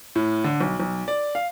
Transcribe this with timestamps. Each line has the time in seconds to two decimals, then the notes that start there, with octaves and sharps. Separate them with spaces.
0.16 A2
0.44 D3
0.61 B1
0.80 B1
1.08 D5
1.35 F5